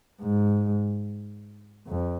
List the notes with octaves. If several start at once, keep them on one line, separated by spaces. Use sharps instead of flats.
G#2
F2